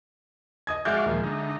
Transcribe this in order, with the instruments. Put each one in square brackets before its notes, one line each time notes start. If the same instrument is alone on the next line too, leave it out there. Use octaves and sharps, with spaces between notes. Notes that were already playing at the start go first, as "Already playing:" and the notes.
[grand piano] D#5 D#6 G#6
[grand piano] G#3 E5 G6 [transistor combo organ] F#4 D5 F5
[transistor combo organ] D#2 A#2 F3
D3 D#4